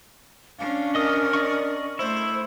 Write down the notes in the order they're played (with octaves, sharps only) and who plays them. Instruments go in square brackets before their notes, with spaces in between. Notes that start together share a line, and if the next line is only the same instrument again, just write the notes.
[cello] C#4 D4 [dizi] F5
[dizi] A#4 [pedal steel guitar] D#5 D#6
[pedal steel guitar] D5 D#5 C#6
[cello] A3 [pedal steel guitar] E4 [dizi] C5